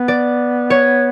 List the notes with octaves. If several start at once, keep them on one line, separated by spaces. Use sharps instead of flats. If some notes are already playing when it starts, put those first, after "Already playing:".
Already playing: B3
D5
C#5